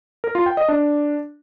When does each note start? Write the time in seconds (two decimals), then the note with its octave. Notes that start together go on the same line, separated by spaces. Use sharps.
0.24 A#4
0.35 F4
0.46 G5
0.57 D#5
0.68 D4